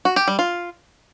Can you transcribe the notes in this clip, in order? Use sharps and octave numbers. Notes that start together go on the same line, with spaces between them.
F#4
G4
G3
F4